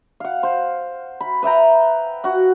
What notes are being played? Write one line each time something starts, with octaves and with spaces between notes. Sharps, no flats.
F5 F#5
C5
B5
B4 E5 G5 A#5
F#4 F#5